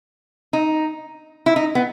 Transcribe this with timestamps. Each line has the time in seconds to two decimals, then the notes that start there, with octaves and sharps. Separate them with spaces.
0.53 D#4
1.46 E4
1.56 D#4
1.75 B3